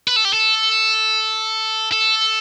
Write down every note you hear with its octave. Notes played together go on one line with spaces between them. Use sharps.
B4
A4
G4
A4
A4